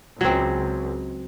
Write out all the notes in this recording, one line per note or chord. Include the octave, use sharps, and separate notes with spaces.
C#2 F#3 C4